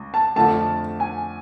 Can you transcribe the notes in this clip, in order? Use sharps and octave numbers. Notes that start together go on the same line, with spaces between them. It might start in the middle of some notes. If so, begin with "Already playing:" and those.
Already playing: C#2
A5
F2 D3 F3 A3 A5
G#5